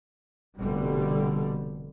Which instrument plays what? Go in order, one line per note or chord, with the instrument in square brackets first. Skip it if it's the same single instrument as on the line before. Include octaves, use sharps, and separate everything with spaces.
[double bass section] F1 B2 D3 G3